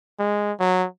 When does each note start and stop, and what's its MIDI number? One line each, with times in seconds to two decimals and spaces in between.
0.19 0.52 56
0.60 0.86 54